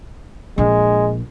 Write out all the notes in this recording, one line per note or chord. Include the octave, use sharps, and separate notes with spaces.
A#1 G#3 D4